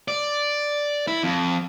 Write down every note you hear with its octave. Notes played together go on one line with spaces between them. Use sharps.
D5
E4
F2